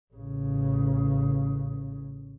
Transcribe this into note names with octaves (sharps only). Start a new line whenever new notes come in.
A1 C#3